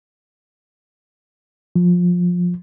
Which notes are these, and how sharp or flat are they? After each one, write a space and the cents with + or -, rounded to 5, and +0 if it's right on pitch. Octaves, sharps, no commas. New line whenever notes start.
F3 +20